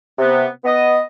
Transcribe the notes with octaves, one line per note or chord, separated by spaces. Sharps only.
C3 B3
B3 D#5